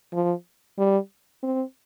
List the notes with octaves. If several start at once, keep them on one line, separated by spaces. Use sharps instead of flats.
F3
G3
C4